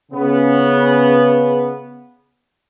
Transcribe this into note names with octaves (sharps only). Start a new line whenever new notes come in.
C#3 B3